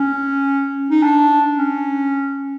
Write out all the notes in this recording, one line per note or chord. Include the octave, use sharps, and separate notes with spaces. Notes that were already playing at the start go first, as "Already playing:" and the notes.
Already playing: C#4
D#4
D4
C#4